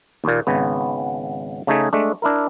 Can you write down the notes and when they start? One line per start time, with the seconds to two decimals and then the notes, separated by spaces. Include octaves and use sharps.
0.24 D#2 A#2
0.47 G#1 C#3 B3
1.67 C#3 A3 D#4 G#4
1.93 G#3 A3 D4
2.22 D4 E4 A#4